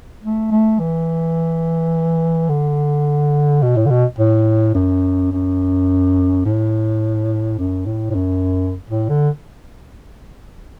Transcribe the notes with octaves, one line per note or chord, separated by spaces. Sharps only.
A3
A3
E3
D3
B2
A2
D3
B2
A2
F#2
F#2
A2
F#2
A2
A2
F#2
A2
D3